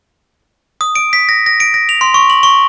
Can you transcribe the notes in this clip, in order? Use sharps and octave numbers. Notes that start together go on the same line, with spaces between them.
D#6
D7
B6
A#6
A#6
D7
A#6
F7
C6
C#6
F#7
C#6